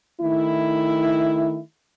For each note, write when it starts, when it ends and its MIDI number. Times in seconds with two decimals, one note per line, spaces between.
0.21 1.60 51
0.21 1.60 57
0.21 1.60 64